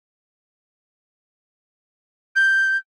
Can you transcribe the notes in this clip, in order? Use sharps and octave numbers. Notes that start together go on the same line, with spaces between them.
G6